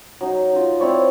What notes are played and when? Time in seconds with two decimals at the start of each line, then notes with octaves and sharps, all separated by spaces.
0.21 F#3 D#4
0.52 D#4 F4
0.80 C4 E4 C#5 D5